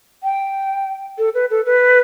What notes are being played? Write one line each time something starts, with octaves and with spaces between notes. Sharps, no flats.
G5
A4
B4
A4
B4